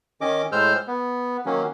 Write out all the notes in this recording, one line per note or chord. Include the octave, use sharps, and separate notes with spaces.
D#3 C#4 D#5 D6
A2 G#3 C5 E6 F6 G6
B3
D#3 F#3 A#3 C#4